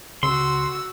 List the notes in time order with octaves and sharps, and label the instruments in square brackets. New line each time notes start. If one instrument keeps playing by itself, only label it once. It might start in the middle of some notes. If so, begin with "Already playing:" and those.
[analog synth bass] C#2 [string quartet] F#4 E6 [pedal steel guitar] C6